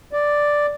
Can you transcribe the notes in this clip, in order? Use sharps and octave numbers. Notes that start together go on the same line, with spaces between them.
D5